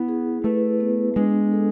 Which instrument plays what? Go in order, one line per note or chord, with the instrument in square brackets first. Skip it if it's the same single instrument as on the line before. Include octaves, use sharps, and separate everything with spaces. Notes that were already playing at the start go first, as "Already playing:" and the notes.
Already playing: [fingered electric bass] B3 [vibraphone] E4
[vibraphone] G#4
[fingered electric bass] A3 [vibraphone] B4
[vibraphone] B3
[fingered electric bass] G#3 [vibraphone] D4
[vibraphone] A4